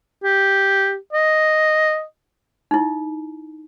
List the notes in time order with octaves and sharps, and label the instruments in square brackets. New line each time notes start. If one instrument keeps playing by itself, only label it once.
[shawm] G4
D#5
[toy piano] D#4 E4